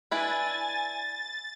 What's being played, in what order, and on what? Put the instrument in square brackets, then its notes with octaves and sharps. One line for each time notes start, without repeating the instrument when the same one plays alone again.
[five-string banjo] D4 E4 B4 [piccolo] G#5 [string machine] A6